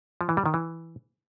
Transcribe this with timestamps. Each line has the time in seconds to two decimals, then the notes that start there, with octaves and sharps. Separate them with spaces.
0.21 F3
0.29 E3
0.37 G3
0.46 D#3
0.54 E3